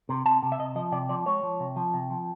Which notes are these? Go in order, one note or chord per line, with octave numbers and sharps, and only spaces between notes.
C3
C3 A5
C3
E5
C3 D#5
F3 D#5
C3 D5
F3 D5
G#3 C#5
F3
C3
F3
C3
F3